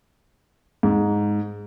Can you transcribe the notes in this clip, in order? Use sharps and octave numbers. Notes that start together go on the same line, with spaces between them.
G#2